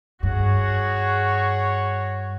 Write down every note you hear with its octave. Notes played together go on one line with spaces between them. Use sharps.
G2 F#4 G#4 C#5